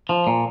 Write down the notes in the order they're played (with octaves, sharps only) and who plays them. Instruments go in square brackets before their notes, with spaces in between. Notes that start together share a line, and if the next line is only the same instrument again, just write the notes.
[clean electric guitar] F3
A#2